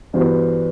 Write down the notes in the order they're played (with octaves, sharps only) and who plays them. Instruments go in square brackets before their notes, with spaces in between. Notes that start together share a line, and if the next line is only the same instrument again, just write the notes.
[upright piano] G2 E3 B3 F#4 C5